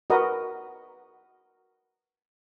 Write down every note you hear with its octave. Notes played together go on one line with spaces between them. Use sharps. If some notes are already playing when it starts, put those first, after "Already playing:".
F#4 A#4 B4 D#5